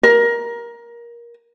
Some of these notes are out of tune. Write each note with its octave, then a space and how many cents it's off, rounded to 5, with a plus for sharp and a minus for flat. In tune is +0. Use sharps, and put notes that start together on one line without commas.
A#4 +20